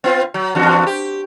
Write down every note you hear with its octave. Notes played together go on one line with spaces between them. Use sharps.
B3 C4 F4
F#3
E2 G2 F#4
G4